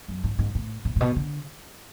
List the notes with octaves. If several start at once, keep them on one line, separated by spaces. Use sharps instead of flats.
F#2
G#2
G#2
A2
A2
A2
B2
D3